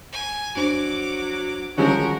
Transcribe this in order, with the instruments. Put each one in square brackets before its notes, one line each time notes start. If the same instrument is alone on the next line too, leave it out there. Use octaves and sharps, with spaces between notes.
[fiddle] G#5
[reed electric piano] F2 D4 C5 [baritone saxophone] F#3 [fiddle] D6
[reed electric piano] D3 D#3 G3 [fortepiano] F3 G#3 C#4 [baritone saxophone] F#4 [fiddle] A#4